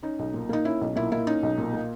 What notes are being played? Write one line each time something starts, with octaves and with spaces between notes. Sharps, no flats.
C#4 D#4
B1
A#2
A#3 D#4
C#4 E4
B1
A#2 E4
A#3 E4
C#4 D#4
B1
A#2
A#3